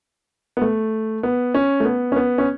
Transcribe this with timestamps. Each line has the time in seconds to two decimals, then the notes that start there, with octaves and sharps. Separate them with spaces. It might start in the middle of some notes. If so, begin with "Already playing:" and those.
0.57 B3
0.62 A3
1.23 B3
1.54 C#4
1.80 A3
1.85 B3
2.12 C#4
2.16 B3
2.38 C#4